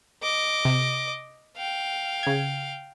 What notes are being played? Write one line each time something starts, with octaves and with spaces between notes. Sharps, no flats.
D#5 D6
C3
F5 G5
C#3 G#6